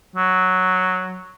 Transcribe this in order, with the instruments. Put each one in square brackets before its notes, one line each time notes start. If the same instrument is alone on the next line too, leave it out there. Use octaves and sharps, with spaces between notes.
[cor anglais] F#3